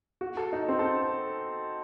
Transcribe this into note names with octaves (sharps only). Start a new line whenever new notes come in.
F#4
A4
D#4
C4
A4